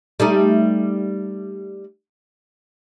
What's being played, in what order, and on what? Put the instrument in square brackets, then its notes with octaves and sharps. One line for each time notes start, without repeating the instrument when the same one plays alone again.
[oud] G3 A3 D#4